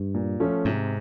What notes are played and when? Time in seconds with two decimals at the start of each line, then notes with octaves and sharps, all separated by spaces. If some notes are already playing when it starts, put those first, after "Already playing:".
Already playing: G2
0.14 A#2
0.40 F3 A3 C#4
0.65 G#2 C3